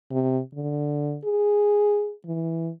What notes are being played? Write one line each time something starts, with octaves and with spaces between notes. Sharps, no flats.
C3
D3
G#4
E3